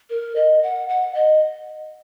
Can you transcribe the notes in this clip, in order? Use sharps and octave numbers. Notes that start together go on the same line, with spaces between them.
A#4
D#5
F#5
F#5
D#5